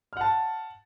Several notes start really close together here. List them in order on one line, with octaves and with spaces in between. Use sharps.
F6 F#5 A5